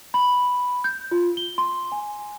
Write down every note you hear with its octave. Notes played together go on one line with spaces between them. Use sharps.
B5
G6
F4
G7
C6
G#5